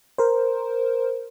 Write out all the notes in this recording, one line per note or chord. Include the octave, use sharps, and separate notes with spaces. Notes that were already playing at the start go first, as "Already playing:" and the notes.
A#4 C5